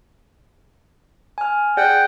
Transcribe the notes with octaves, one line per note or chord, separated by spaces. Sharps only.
G#5 F6
G#4 D5 F#5 G5